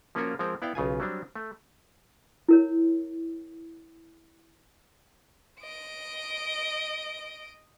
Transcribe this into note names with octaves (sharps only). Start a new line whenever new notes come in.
F3 A#3 C#4 F4 F#4 A#4
F3 G#3 C4 A#4
B3 E4 D5 F5 G5
B1 C#3 F4 G#5
F#3 G3 C4 D4
A3
E4 A#4 C#5
D#5 D7